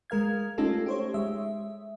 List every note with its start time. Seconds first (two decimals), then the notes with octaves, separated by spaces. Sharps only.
0.10 G#3 A#4 F5 G#6
0.58 A3 C#4 D#4 F4 G4 A4
0.86 G4 C5 C#5
1.14 G#3 E5